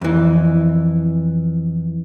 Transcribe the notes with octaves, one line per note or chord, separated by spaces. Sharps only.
F2 E3